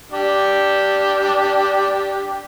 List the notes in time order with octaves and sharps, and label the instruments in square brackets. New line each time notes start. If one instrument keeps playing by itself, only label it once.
[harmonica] D4 G4